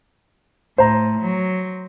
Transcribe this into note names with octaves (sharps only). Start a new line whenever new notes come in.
A2 C5 A#5
F#3